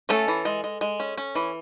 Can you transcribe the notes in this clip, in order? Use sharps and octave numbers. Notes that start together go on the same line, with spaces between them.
A3 C#4 A4
E3
G#3
G#3
G#3
C#4
C#4
E3